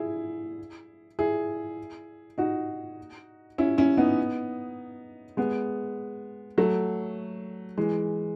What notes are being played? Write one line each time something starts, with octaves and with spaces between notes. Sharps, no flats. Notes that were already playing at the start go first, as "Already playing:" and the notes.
Already playing: E4 G#4
E4 G#4
D#4 F#4
C#4 E4
C#4 E4
B3 D#4
G#3 B3
F#3 A3
E3 G#3